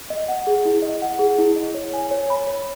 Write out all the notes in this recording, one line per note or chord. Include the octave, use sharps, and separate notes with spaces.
D#5
F#5
G#4
E4
D#5
F#5
G#4
E4
D#5
C#5
G#5
C#5
B5
C#5